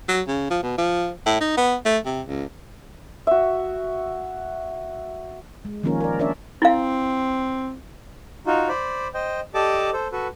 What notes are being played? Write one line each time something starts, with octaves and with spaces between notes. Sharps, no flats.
F#3
C#3
F3
B2
F3
A2
D#4
B3
A3
C3
C#2
F#4 E5
G#3
D#3 F3 A#3 C#4 F4 A#4
A#4 D5
C#4 D4 A#4 C#5 D5 E5
C4 E4 F5
D#4 F4 F#4
C5 D5 B5
C5 D#5 G5
G4 A4 D5 D#5 A5 D6
A4 C5
F#4 A4 B4